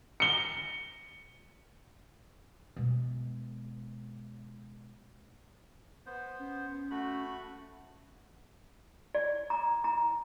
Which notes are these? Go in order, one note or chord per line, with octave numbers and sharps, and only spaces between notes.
C#7 G7
B2 G#3
B3 C5
C#4
A3 F#4 B5
D5
A#5
A#5